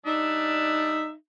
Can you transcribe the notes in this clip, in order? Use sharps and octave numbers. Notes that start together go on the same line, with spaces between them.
G3 D4 D#4 E5